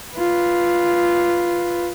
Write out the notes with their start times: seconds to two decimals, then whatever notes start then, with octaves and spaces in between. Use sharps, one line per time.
0.14 F4 B4